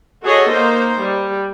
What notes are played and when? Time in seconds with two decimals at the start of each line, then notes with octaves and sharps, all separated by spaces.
0.23 F#4 G#4 A4 C#5 D#5
0.52 A#3 D#4 C5
1.02 G3